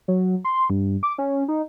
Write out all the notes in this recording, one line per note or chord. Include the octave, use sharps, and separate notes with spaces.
F#3
C6
G2
D6
C#4
D#4